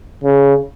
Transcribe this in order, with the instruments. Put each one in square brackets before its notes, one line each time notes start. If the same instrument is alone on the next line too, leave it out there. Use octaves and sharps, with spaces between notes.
[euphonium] C#3